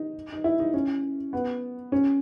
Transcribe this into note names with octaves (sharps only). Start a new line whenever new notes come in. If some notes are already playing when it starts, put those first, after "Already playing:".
Already playing: D#4
D#4
E4
D#4
C#4
B3
C#4